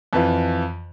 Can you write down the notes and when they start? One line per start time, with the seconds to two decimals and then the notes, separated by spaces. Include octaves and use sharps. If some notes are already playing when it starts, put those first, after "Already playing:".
0.13 F2 E3 F4